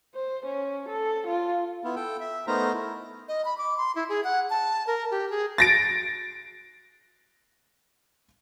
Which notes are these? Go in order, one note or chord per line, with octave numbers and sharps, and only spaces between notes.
C5
C#4
A4
F4
B3 E4 F4
A4 G5
E5
A3 B3 D#4 A#4 C5 A#5
E4
D#5
B5
D6
C6
E4
G#4
F#5
A5
A#4
G4
G#4
A6 A#6 D7